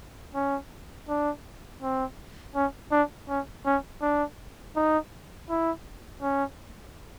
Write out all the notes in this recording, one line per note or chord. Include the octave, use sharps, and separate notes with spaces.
C#4
D4
C4
C#4
D4
C#4
C#4
D4
D#4
E4
C#4